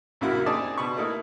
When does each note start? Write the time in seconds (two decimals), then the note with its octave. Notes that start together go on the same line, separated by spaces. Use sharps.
0.21 A#1 F#2 C#3 A#3 E4 F#4
0.46 C4 D4 D#4 G#4 D5 A5
0.78 B2 B5 C#6
0.96 A3 A#3 D#4 E4